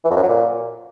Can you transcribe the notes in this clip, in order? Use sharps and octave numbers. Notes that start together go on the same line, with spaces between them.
E3
F2
F#2
F#3
A#2